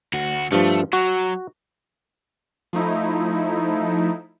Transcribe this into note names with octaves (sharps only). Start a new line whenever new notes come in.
D2 F#4
G2 F3 A3
F#3 F#4
F3 A3 D#4 E4